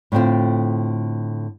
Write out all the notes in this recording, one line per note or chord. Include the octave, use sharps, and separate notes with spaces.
A2 D3 C4 F4